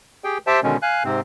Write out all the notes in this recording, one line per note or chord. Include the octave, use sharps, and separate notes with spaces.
G4 G#4 G5
G4 C5 E5 G5 A5
B2 D3 D#3 G#3 C#4
F5 G#5 F#6
G#2 C3 C4